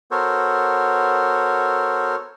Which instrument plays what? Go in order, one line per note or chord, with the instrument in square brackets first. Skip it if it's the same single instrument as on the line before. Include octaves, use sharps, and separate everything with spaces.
[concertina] B3 F#4 A4 A#4 C5 C#5